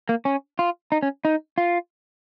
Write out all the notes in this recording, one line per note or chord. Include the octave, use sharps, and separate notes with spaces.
A#3
C#4
F4
D#4
C#4
D#4
F4